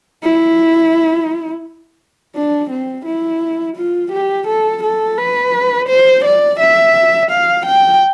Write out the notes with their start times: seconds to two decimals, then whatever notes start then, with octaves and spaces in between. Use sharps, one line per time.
0.23 E4
2.36 D4
2.70 C4
3.06 E4
3.77 F4
4.12 G4
4.48 A4
4.83 A4
5.18 B4
5.89 C5
6.25 D5
6.60 E5
7.31 F5
7.66 G5